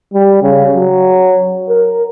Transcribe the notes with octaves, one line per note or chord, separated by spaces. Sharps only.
G3
C#3
F#3
A#4